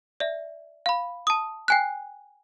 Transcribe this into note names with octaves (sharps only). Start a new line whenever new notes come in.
D5 E5
F5 B5
A5 D#6
G5 G#5 F#6